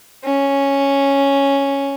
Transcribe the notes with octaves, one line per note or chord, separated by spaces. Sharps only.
C#4